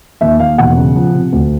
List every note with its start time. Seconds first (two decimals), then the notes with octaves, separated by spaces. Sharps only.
0.21 D#2 E5
0.40 D#2 F5
0.58 E1 F#5
0.77 C#3
0.96 F3
1.14 C3
1.32 D2